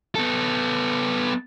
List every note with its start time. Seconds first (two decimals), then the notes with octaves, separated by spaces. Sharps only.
0.15 B3 A4